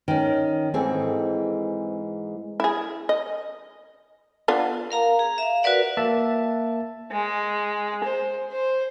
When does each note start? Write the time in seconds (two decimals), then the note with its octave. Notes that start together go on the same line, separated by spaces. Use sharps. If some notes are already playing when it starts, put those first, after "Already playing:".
0.08 D#3 C#4
0.74 G#2 E3 C4 G#4 A4
2.60 E4 G#4
3.09 D#5
4.48 B3 D4 F4
4.91 A#4 F5 A#5
5.19 G#4 A#5
5.38 E5 F5
5.63 F#4 A#4 B4 D5 F#5
5.97 A#3 E5 A5
7.12 G#3
8.04 C5
8.51 C5